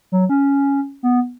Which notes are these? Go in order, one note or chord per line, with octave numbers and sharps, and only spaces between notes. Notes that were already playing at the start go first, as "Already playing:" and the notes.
F#3
C#4
B3